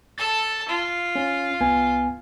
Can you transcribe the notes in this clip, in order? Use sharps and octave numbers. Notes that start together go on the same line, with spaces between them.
A4 A5 A6
F4
C#4
C2 B3 G#5